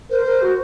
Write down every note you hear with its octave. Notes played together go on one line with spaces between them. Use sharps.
A#4 C5
A#4
F#4